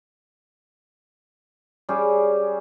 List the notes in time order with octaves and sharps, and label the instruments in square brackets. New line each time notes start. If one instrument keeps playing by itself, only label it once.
[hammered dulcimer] G3 C#4 G4 G#4